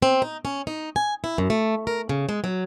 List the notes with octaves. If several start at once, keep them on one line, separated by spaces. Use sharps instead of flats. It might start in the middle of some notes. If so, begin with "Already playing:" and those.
C4
D#4
C#4
D#4
G#5
E4
F#2
A3
A#4
C#3
G#3
F#3